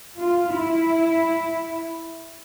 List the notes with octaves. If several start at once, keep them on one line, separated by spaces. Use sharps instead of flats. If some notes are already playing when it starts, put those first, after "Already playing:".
F4
E4